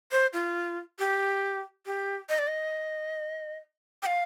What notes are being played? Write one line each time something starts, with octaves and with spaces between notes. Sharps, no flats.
C5
F4
G4
G4
D#5
D5
D#5
G5
F5